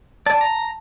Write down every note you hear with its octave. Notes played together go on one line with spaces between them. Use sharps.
D5 A5
A#5